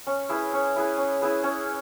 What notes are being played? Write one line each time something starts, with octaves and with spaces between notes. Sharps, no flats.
C#4
E4 G#4 B4
C#4
E4 G#4 B4
C#4
E4 G#4 B4
C#4